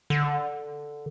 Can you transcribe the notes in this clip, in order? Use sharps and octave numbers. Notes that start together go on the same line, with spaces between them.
D3